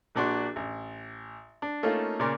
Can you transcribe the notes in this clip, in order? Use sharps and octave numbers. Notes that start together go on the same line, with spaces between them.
A#1 A#2 D4 F#4 C6
A1
D4
A3 A#3 C#4 D#4 F4 A4
A#2 C#3 A#4 D5 C6